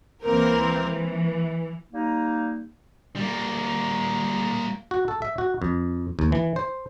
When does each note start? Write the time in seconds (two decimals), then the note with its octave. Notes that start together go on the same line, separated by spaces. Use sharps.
0.23 C#2 E3 A#3 C4 A#4
0.84 E3
1.91 G3 A#3 D#4
3.16 G3 A#3
4.91 F#4
5.08 A4
5.22 E5
5.38 F#4
5.62 F2
6.19 D#2
6.32 E3
6.56 C5